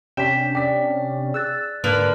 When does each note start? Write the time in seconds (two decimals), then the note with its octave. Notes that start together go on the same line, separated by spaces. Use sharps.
0.17 C3 C#4 D4 G5 B6 E7
0.55 D5 G5 B6
1.34 G#4 E6 F#6 A6
1.84 G#2 D3 A#3 B4